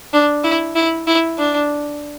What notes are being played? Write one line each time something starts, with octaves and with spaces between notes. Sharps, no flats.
D4
E4
E4
E4
D4